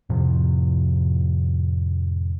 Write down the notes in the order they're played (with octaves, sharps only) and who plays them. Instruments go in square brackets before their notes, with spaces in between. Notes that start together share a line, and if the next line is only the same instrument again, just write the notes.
[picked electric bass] F2 A2 C3 F3